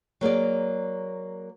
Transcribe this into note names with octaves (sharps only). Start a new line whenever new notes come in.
F#3 A#3 G#4 D5